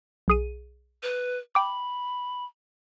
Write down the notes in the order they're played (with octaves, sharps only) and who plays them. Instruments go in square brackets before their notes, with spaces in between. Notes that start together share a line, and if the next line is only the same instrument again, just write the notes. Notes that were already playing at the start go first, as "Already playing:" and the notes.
[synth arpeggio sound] B1 G#4 D#7
[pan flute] B4
[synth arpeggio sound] G5 D6 [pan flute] B5